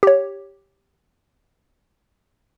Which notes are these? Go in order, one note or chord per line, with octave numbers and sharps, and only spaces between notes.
G4 C#5